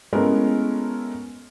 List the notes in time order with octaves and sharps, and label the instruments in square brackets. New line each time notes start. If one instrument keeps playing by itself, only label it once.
[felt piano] G#3 A3 B3 C#4 E4 A#4